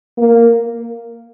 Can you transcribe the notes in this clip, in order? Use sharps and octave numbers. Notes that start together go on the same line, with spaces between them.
A#3